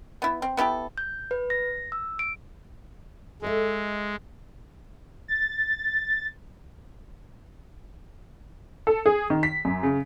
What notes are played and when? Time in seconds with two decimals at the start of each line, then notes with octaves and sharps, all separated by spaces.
0.22 B3 E4
0.42 C4
0.57 B3 E4 G4 A4
0.98 G6
1.31 B4
1.50 A#6
1.92 E6
2.19 D7
3.42 G#3 A4 D#5 E5
5.28 A6
8.87 A4
9.06 G#4
9.30 D#3
9.43 B6
9.65 F#2
9.83 C#3